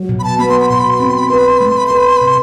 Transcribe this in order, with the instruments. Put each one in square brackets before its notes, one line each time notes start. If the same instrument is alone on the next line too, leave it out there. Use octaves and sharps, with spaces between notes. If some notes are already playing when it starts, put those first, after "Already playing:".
Already playing: [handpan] F#3
B2
[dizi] B5
A5
[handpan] B3 [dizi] B5
[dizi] C6
B5
[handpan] B2 [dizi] C6
[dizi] B5
C6
[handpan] C4 [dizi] B5
[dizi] C6
B5
[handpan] B4 [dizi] C6
[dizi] B5
C6
[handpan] A3 [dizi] B5
[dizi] C6
B5
[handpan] B4 [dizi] C6
[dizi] B5
C6
B5
[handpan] C3
[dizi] C6